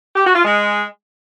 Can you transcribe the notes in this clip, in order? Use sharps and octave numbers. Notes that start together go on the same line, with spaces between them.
G4
F#4
F4
G#3